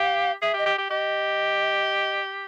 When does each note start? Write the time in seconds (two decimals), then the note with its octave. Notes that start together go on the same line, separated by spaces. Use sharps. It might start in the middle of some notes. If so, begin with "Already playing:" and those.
Already playing: G4 F5
0.42 G#4 E5
0.54 G4
0.58 D#5
0.66 G4
0.78 G4
0.90 G4 D#5